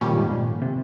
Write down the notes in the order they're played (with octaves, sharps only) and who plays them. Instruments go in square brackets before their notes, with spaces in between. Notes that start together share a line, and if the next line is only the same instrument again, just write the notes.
[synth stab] F2 D#3 G3 C#4 G4 [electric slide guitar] A#2
[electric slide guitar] G#2
A#2
C3